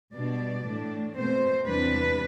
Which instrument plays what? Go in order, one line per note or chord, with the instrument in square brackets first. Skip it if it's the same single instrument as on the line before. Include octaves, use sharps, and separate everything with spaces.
[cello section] B2 G3 B3 D4 D5
A2 E3 A3 D4
B2 A3 C4 C5
E2 C3 G3 D4 B4